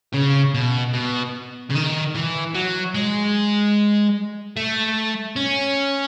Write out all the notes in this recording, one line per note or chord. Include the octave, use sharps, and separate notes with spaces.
C#3
B2
B2
C#3
D#3
E3
F#3
G#3
A3
C#4